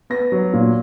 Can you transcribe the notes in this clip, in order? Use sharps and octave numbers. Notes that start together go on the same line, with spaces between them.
B3 A#6
F#3
A#2